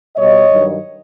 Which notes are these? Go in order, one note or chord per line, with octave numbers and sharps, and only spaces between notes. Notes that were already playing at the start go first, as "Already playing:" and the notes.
B2 G3 C#5 D#5
G2 D#3 F#3